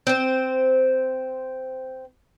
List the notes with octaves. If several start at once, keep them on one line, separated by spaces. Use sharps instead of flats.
C4 C5